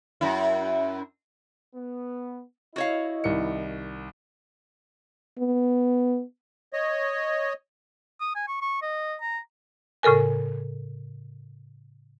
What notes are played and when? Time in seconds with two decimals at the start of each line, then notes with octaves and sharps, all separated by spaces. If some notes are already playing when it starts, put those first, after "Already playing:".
0.21 F#2 E4
1.75 B3
2.76 E4 F#4 C#5 D#5 F5
3.24 C2 D#3 C#7
5.39 B3
6.73 C#5 D#5
8.20 D#6
8.35 G#5
8.48 C#6
8.62 C#6
8.82 D#5
9.21 A#5
10.03 A2 C#3 A4 A#4 G#5